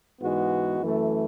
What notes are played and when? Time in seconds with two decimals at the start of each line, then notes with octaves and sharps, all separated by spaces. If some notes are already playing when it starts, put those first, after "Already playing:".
0.21 G#2 E3 G#3 B3 F#4
0.80 F#2 E3 A3